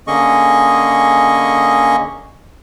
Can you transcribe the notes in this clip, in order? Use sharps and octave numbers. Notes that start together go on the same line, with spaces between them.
D3 A#3 C#4 G#4 D#5 C#6